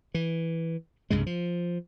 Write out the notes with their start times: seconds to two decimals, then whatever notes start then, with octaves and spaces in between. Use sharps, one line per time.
0.14 E3
1.10 C2 G2 C#3 G#3
1.26 F3